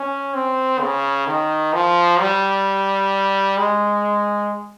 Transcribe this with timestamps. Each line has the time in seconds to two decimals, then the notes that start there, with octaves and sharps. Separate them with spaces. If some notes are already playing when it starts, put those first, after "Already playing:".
Already playing: C#4
0.34 C4
0.80 C#3
1.27 D#3
1.73 F3
2.20 G3
3.58 G#3